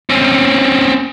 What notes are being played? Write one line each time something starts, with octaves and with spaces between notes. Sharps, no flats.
C4 C#4